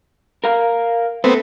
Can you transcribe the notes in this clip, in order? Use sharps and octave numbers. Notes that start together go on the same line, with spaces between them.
A#4 F5
A3 B3 C4